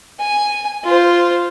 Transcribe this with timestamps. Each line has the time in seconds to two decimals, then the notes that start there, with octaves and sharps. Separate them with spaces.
0.19 G#5
0.84 F4 C5